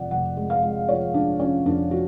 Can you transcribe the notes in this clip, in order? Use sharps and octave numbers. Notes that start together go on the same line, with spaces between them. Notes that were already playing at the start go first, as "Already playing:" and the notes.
Already playing: F1 F2 F3 D5 F#5
F1 F#5
G#3
F5
G#3
F3 C#5
F3 D4
F3 C#4
F2 D4
F3 F#4